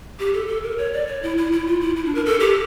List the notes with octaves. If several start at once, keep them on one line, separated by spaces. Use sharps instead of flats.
G4
A4
A4
A#4
C#5
D5
C#5
E4
E4
E4
F4
E4
E4
D4
A#4
A4
G4